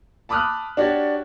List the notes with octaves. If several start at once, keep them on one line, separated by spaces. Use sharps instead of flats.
A5 B5 D6 D#6 F6 F#6
D4 F#4 G4 C#5 D5